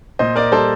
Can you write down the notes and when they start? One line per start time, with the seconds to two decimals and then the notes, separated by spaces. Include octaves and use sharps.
0.19 A#2 C5 D#5
0.36 A#3 A#4 D5
0.52 G3 A4 C5